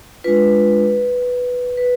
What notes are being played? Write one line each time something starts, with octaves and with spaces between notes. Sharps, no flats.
G#3 D4 F4 B4
B4